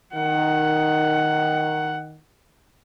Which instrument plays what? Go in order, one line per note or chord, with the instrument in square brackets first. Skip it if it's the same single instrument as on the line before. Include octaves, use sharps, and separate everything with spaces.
[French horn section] D#3 [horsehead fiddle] F#5